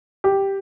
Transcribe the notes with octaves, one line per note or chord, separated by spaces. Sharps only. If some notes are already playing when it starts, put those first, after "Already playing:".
G4